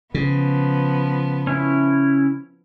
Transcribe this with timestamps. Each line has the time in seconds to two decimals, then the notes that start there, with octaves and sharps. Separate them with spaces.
0.14 C#3 F3 B3
1.47 C#4 E4